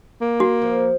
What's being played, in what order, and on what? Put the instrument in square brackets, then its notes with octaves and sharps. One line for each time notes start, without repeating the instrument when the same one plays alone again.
[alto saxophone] A#3
[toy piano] F#4
[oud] F3